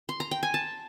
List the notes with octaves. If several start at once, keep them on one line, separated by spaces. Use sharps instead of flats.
C6
A#5
G5
G#5
A5